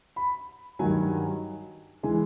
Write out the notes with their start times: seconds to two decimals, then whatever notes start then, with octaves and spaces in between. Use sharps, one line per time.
0.16 B5
0.79 G2 D#3 F#3 G#5
2.03 E3 G#3 G#5